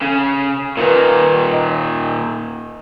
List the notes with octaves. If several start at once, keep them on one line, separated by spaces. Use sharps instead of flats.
C#3 A4
A#2 D#3 A#4 B4
D#5